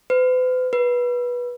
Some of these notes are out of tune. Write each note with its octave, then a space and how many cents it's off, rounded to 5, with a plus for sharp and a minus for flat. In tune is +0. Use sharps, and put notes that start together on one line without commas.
B4 +45
B4 -20